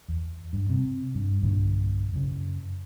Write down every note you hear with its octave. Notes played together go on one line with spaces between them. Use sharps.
E2
G2
C3
G2
B1 G2 A#2 D3
F#2 C#3